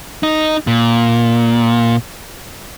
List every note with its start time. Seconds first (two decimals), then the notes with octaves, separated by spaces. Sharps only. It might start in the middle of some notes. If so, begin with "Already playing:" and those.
0.23 D#4
0.67 A#2